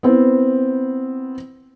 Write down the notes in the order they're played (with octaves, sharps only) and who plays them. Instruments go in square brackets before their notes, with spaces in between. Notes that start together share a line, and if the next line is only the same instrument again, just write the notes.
[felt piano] B3 C4 E4